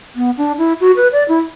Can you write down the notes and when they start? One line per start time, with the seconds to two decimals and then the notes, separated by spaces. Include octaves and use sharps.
0.16 B3
0.37 D4
0.58 E4
0.80 F#4
0.97 B4
1.12 D5
1.29 E4